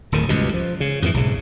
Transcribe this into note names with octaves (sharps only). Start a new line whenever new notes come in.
D1 A2 D#3
C#2 G2 B2
F3
C#3
F2 G#2 D#3 E3
B1 G#2 C#3